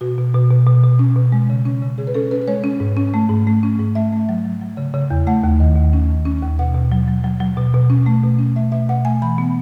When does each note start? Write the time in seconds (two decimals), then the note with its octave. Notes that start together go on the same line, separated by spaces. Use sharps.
0.01 B2 F#4
0.18 B2
0.34 B2
0.51 B2
0.66 B2
0.83 B2
0.99 C#4
1.16 B2
1.32 G#3
1.50 C#3
1.65 C#4
1.82 C#3
1.98 C#3 G#4
2.07 B4
2.14 C#4 A4
2.31 C#4 B4
2.42 B4
2.48 G#3 C#5
2.64 C#4
2.80 G#2
2.97 C#4
3.14 A3
3.30 G#2
3.47 A3
3.63 C#4
3.79 G#2
3.95 A3 E5
4.13 A3
4.29 F#3
4.44 F#3
4.61 F#3
4.77 C#3
4.94 C#3
5.11 E2
5.27 A3 F#5
5.44 D#2
5.60 D#3
5.76 D#2
5.93 C#4
6.10 D#3
6.25 C#4
6.42 D#2
6.59 B2 F#5
6.74 B2
6.92 F#3
7.08 F#3
7.24 F#3
7.40 F#3
7.57 B2
7.74 B2
7.90 C#4
8.06 A3
8.23 B2
8.39 C#4
8.56 A3 E5
8.72 B2 E5
8.89 B2 F#5
9.05 A3 G#5
9.22 E3 B5
9.38 B3